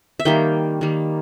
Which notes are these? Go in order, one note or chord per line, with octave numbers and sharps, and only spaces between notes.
E5
D#3 G3 A#3 G5
D#3 G3 A#3